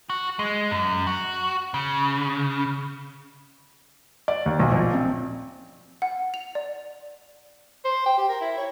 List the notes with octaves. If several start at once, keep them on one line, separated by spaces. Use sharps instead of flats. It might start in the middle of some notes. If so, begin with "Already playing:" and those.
F#4
G#3
F#2
F#4
C#3
D5
D#2
B1
A#1
C4
F#5
F7
D5
C5
G5
G4
A#4
E4
C#5